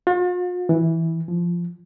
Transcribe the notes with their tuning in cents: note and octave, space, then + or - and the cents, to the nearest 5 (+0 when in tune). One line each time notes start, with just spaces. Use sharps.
F4 +45
E3 -10
F3 -10